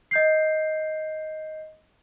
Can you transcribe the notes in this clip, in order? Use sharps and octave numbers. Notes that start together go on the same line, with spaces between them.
D#5 G6 C7